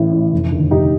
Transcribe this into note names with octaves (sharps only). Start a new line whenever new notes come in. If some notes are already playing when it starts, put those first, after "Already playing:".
Already playing: A1 A2
A2
F1
D#2 D3
F1 D#4 G4